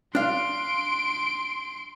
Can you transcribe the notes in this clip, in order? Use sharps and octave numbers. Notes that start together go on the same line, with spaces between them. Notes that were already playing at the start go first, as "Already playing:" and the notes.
D4 F5 C6 D7